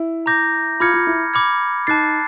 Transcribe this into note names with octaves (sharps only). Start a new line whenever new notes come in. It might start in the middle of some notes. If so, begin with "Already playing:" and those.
Already playing: E4
A#5 D6 G6 A#6
F4 B5 D6 F6 G#6 C#7
F4
E4
B5 D6 F6 G#6 C#7
D#4 A5 D6 F#6 A6 C7